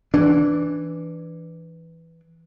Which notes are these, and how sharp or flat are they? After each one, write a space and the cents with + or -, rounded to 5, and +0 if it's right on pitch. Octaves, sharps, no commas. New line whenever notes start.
E3 +0 D4 +0